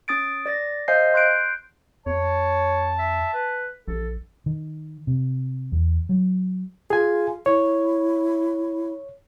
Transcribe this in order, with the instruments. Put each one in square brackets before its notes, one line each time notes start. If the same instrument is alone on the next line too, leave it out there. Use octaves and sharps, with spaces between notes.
[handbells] C#4 D#6 A6 D7
D5 A6 A#6
C5 D#5 F5 G#5 G6 C7
C6 F#6 G6 C7 D7
[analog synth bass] F2 [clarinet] C#5 [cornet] A5
[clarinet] E5
B4
[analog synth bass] A#1 [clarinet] A4
[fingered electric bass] D#3
C3
E2
F#3
[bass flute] F4 [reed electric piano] G#4 G#5
[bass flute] E4 [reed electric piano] C#5